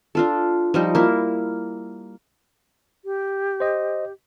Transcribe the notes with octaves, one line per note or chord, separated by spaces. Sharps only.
D4 F4 A4
F3 G3 D#4
A#3 E4
G4
C5 D#5